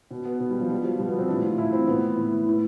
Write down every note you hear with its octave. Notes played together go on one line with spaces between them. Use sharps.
B2
B3
B2
G3
F3
B2 G3
F3
B2 G3
B3
C4
A2 E3 D4
F4
A2 E3 E4
C4
A2 E3 B3
A2 E3
A2 E3